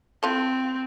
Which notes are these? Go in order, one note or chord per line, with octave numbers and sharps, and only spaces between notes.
C4 E4 F4 A4